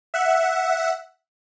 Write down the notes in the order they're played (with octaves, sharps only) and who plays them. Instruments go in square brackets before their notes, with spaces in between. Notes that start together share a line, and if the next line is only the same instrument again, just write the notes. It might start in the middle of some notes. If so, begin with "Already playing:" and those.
[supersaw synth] E5 F#5